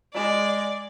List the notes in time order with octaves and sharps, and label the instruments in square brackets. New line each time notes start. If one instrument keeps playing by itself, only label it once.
[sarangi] G#3 [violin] D5